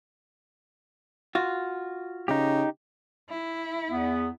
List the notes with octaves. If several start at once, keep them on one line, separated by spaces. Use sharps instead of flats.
F4 F#4
C#3 D#4 G4
E4
E2 B3